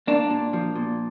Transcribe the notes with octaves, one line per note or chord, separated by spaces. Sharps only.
A#3 D4
A#2
F3
A#2